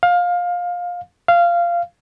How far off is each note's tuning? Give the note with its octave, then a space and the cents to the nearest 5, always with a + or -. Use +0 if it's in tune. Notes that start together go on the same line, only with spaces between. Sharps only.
F5 +20
F5 -15